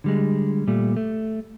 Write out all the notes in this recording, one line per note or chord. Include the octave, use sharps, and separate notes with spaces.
D3 G3 G#3
A#2 G3 A3
A3